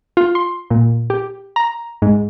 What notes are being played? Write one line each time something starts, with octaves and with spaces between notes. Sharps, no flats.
F4
C6
A#2
G4
A#5
G#2